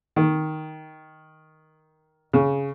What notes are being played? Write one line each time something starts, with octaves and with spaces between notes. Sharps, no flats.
D#3
C#3